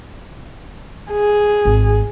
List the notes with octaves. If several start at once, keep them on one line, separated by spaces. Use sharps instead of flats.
G#4
G#1